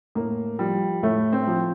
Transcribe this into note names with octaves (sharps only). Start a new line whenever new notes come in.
A2 A#3
F3 G3
A2 A3
C4
F3